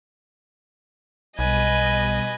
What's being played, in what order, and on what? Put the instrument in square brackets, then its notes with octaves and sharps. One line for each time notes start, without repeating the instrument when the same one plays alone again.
[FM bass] B1 [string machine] B2 G3 B5 [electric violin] B4 G#5 [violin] D#5